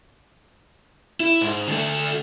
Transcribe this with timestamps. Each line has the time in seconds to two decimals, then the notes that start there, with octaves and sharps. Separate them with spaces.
1.20 E4
1.41 G#2
1.68 D3 A3